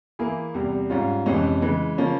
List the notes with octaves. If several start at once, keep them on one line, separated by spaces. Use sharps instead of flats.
E3 A#3 E4 G#4
E2 C3 G3
G#2 G3 C#4 F4
F2 C3 E3 G#3 C#4
C#3 E3 G#3
C#3 F3 A#3 C#4